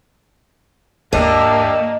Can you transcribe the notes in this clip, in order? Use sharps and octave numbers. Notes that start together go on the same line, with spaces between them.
D#2 G#2 A#3 D4 G4 D#5 E5